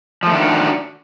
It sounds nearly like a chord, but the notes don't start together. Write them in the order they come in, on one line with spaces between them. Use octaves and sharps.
F3 A3 D#3 D4 F#4